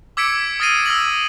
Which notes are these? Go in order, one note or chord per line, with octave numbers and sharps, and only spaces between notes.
D6 E6 G#6 B6 C#7 D7
D#6 F6 A6 A#6 C7 D#7
E6 A#6 F#7